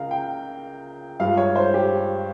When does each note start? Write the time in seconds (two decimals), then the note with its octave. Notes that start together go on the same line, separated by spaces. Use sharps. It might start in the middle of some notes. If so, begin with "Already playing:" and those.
Already playing: C#2 C#3 A#4 F5
0.11 G5
1.20 G2 F3 G#3 F5
1.37 C#5
1.56 C5
1.74 G4